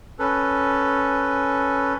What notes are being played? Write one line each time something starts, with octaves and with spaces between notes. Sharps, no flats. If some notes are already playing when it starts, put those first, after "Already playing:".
C#4 A4 B4